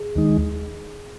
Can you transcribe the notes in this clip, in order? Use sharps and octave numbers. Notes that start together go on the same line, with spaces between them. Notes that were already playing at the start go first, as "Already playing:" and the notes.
Already playing: G#4
D#2 D#3 G#3 D#4